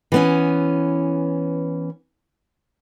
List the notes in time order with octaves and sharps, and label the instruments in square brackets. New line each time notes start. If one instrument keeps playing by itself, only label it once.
[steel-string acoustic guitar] E3 B3 C#4